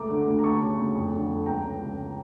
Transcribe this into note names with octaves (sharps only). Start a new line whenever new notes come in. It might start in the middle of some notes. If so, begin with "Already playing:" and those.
Already playing: C#2 A3 A#5 D6
D3
D2
A#5
D2 A5 C#6
C#3
D2
F2
D3
F2
C#2 G5 A#5
C#3
C#2